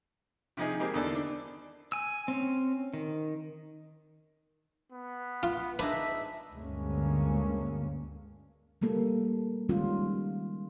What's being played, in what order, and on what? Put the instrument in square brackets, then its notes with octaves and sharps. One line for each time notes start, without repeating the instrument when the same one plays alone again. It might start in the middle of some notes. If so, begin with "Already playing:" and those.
[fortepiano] C3 F3 D#4 G#4
G#3 A#3 C4 G4 G#4
E2 D3 D#3 A4 D5 E6
D4
[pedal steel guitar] G#5 E6
C4 C#4
D#3
[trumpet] B3
[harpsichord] F4
[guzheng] D4 D#4 G#4 [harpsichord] B4 [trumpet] E5
[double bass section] D2 G2 D3 G#3 A#3 C#4
[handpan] G3 A3 A#3 A4
D#3 G3 G#3 C#4 F4